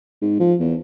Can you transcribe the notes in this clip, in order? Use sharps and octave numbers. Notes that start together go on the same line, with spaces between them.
G#2
F3
E2